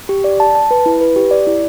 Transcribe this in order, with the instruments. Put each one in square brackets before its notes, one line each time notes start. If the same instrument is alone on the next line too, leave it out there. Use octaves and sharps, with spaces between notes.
[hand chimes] G4
D5
A5
A5
B4
E4
B4
G4
D5
E4